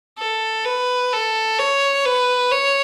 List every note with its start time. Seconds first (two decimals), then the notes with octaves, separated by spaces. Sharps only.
0.19 A4
0.65 B4
1.13 A4
1.59 C#5
2.06 B4
2.52 C#5